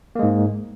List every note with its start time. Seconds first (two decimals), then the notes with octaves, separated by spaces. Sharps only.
0.15 A#3
0.19 G#3
0.23 G#2